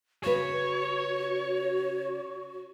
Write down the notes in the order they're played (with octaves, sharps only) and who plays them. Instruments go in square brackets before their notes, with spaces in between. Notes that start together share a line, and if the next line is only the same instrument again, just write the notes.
[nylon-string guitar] C#3 B4 [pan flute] F#4 [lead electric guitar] C#5